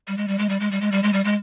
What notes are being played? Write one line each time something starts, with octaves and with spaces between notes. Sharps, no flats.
G3
G#3
G3
G#3
G3
G#3
G3
G#3
G3
G#3
G3
G#3